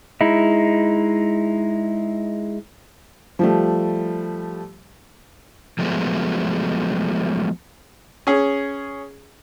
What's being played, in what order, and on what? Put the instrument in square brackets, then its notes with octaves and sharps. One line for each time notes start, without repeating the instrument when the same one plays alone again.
[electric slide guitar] G#3 D#4 E4
[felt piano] F3 G3 A3
[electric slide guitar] F3 F#3 G#3 A3 B3
[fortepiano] C#4 G#4